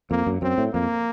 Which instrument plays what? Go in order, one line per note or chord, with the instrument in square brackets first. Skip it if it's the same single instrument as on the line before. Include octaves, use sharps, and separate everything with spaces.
[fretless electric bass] F2 [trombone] A#3
[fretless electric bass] F#2
[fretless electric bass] F#2 [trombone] C4
[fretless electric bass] A2
[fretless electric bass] F2 [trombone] A#3